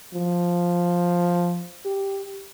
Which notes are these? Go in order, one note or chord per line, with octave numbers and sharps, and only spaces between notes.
F3
G4